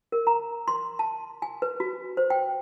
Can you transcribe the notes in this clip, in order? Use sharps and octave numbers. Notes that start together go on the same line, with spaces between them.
A#4
A#5
C6
A5
G#5
B4
F#4
C5
G5